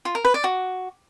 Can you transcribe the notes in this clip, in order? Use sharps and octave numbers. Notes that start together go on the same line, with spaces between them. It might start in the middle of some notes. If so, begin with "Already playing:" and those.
F4
A#4
B4
D5
F#4